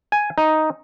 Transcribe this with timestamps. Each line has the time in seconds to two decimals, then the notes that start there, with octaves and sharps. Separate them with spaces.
0.12 G#5
0.38 D#4